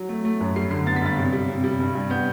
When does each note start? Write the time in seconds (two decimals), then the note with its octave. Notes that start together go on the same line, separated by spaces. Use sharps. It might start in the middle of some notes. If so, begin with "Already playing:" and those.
Already playing: F#3
0.09 A3
0.25 A3
0.40 F#2
0.56 G3 C7
0.71 D3 C7
0.86 B3 A6
0.96 B6
1.02 G2 A6
1.18 C3
1.33 G3
1.48 C3
1.64 G3
1.80 G2
1.95 G2
2.10 B3 G6